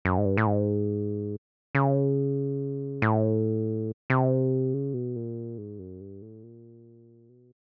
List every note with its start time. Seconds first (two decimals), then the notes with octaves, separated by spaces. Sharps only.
0.05 F#2
0.18 G#2
0.25 G2
0.38 A2
0.47 G#2
1.75 C#3
3.02 A2
4.10 C3
4.74 C#3
4.94 B2
5.16 A#2
5.58 G#2
5.79 F#2
6.01 G2
6.22 A2
6.43 A#2
7.29 B2